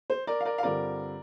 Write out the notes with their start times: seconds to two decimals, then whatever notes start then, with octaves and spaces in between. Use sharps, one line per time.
0.10 C5
0.27 A#4 D5
0.41 F5
0.45 A#4 D5
0.58 F5
0.63 G2 D3 G3 C4 F4 A#4 D5